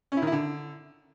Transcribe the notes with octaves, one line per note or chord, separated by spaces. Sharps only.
C#4
E4
D#3
E4
D3